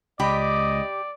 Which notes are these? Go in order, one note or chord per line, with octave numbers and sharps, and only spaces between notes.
C#2 G4 D5 D#5 B5